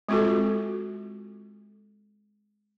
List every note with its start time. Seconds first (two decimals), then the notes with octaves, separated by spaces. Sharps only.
0.09 G#3 C4 F4 F#4 A4